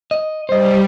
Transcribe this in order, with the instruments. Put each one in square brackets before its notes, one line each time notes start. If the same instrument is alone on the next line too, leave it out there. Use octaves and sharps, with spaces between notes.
[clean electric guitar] D#5
[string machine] G3 [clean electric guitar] C5 D#5